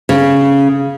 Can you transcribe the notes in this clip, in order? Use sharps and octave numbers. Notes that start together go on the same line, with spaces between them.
C#3